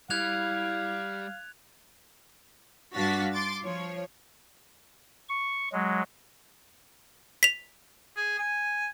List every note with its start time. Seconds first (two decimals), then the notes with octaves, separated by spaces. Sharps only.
0.10 G3 E4 F5 F#6 G#6 F7
2.94 G2 D4 F#4 F5 A6 B6
3.32 C6 D6 A6
3.63 F3 C#5
5.29 C#6
5.72 F#3 G#3
7.43 B6 F7
8.16 G#4
8.38 G#5